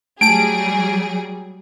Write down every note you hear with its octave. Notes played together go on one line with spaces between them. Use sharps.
F#3 G3 A3 G#4 A5 D7